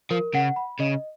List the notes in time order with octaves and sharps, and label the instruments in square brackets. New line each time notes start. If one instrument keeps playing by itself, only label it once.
[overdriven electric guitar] F3 [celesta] A#4
[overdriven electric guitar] C#3 [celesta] F#5
[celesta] B5
[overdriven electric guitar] C#3 [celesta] D#5